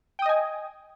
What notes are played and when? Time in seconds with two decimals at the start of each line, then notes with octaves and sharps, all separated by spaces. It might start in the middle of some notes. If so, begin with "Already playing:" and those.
0.19 G5
0.22 D#6
0.26 D#5
0.29 G#5